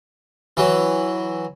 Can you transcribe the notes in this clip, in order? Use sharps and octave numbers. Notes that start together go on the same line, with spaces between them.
E3 F#3